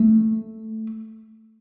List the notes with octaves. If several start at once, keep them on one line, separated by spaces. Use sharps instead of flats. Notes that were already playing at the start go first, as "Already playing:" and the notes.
Already playing: A3